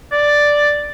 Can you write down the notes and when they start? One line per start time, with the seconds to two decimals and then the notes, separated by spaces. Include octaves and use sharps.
0.12 D5